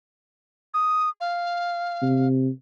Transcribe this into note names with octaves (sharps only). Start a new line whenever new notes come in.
D#6
F5
C3